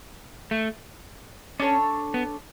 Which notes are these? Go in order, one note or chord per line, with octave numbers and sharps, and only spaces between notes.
A3
C#4 D4 A4 C#5
B3